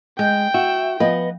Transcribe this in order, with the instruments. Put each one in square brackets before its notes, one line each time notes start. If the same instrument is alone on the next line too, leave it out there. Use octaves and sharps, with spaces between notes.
[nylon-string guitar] G#3 [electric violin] G5 [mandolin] G6
[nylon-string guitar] F#4 [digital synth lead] E5
[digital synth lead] F3 [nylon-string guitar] B3 B4 [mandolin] D#5